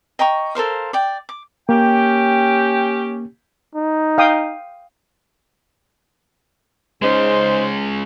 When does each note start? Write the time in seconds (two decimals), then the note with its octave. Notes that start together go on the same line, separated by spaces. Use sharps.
0.19 D#5 G5 A#5 C#6
0.55 A4 A#4 C5 F5
0.93 D5 G5
1.29 D6
1.69 A#3 C#4 G4 G5
3.75 D#4
4.18 F5 G5 D#6
7.02 C#3 G#3 C#4 D#4 C5